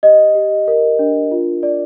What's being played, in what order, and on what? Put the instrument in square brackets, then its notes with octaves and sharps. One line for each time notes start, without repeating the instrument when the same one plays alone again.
[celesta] G4 D#5
G4
A#4
D4
F4
D5